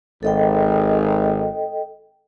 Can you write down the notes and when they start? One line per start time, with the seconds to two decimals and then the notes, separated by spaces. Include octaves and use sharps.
0.23 G#1 A4 D#5 G5